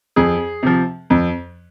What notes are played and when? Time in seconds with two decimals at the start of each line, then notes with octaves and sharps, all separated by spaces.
0.16 F2 G#4
0.63 C3 F3
1.10 F2